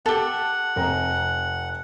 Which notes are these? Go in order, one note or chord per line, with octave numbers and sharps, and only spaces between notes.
G4 A4 F#5 A5
F1 A#5